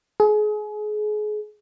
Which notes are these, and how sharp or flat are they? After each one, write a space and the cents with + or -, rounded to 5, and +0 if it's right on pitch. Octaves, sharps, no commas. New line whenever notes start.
G#4 +30